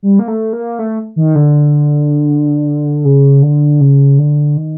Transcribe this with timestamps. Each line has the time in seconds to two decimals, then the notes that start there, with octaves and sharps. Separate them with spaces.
0.03 G3
0.19 A#3
0.28 A3
0.53 A#3
0.79 A3
1.16 D#3
1.35 D3
3.05 C#3
3.42 D3
3.81 C#3
4.18 D3
4.57 D#3